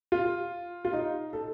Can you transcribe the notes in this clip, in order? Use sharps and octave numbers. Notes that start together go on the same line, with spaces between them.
F4
F4
D#4
A4